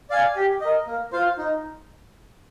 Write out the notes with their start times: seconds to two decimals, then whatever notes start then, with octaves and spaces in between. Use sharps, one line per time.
0.10 D5 F5 G#5
0.36 G4
0.61 A#4 D#5
0.87 A#3
1.12 F4 C5 F5
1.38 D#4